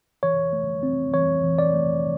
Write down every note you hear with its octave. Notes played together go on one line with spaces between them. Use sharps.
E3 C#5
A3
C4
E3 C#5
E3
D5
A3